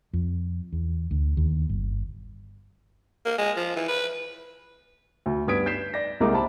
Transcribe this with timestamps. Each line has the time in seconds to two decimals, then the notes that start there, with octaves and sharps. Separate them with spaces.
0.13 F2
0.72 E2
1.11 D2
1.37 D#2
1.69 G1
3.26 A#3
3.39 G#3
3.57 F3
3.76 E3
3.88 B4
5.26 D2
5.47 G2 B3 D#6 G#6 B6 D7
5.66 G6 B6 C7 E7
5.94 D5 A#6
6.20 C2 G#3 A#3 A#5 D6
6.33 C5 A5 B5